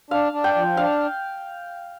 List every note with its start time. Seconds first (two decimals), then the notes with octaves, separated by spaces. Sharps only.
0.11 D4 F5
0.32 D4
0.44 G5
0.55 F3
0.77 D4 F5